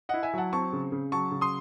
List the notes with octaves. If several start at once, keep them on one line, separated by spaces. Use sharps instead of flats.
E4 D#5 F#5
E5 G#5
F#3 F#5 A5
C4 A5 C#6
C#3
C#3
F#3 A5 C#6
C#3
C6 D#6